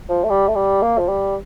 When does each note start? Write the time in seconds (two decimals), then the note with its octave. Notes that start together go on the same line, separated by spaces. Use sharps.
0.09 F3
0.24 A3
0.30 G3
0.48 A3
0.55 G3
0.82 A#3
0.98 F3
1.08 G3